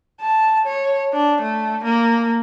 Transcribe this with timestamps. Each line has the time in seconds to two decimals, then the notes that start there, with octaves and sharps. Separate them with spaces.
0.21 A5
0.66 C#5
1.13 D4
1.42 A3
1.84 A#3